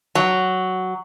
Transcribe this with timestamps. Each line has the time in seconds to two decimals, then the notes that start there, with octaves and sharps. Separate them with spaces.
0.15 F#3